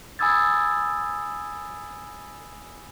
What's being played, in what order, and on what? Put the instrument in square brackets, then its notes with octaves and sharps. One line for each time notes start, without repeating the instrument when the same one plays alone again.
[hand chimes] G#5 B5 D#6 E6 G#6 A6